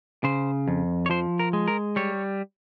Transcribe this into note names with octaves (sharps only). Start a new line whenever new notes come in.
C#3 C5
F2
C#5
F3 C5
A#4
G#3
A#4
G3 C#5